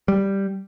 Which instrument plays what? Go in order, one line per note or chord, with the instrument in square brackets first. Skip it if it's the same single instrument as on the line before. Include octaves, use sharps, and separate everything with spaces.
[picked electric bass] G3